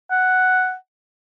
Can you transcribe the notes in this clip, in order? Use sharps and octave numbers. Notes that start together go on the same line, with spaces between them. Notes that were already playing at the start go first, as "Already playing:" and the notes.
F#5